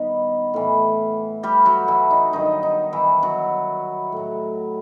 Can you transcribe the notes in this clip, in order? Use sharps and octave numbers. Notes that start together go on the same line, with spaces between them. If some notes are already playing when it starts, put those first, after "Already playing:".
Already playing: G2 D#3 F#3 B3 D#4 B4 D#5
A2 E3
G3 G4
F#3 F#4
E3 E4
D#4
G2 D#3 F#3 D#4
D#4
E3 E4
F#3 F#4
A2 F#3